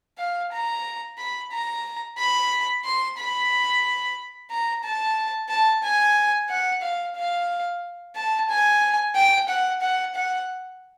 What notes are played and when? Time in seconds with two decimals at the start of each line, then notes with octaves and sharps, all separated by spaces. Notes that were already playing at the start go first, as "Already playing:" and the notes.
0.18 F5
0.52 A#5
1.18 B5
1.52 A#5
2.18 B5
2.85 C6
3.18 B5
4.50 A#5
4.83 A5
5.49 A5
5.83 G#5
6.50 F#5
6.82 F5
7.16 F5
8.16 A5
8.49 G#5
9.15 G5
9.49 F#5
9.81 F#5
10.15 F#5